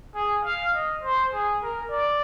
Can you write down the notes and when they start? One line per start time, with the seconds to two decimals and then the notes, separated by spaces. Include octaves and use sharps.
0.15 G#4
0.45 F5
0.74 D#5
1.03 C5
1.33 G#4
1.63 A#4
1.91 D5